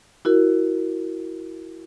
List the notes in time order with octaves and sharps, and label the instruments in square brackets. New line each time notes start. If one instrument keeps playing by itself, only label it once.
[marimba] E4 F#4 A#4